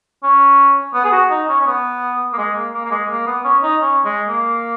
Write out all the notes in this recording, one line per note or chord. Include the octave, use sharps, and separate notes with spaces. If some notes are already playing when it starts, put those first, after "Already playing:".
C#4
B3
G#4
F#4
D#4
C#4
C#4
B3
A#3
G#3
A#3
A#3
A#3
G#3
A#3
B3
C#4
D#4
C#4
G#3
A#3